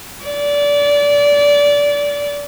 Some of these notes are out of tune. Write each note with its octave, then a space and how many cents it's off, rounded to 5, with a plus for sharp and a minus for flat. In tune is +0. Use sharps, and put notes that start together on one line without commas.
D5 -25